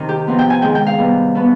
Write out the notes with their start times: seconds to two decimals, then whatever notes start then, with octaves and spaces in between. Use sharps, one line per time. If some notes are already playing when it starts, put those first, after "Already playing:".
Already playing: C3 D#3
0.09 G4
0.27 C3 F3 B3
0.39 G5
0.50 G#5
0.62 D#3 G#3 C4 G5
0.75 G5
0.87 F5
0.98 C3 G3 B3
1.35 B2 B3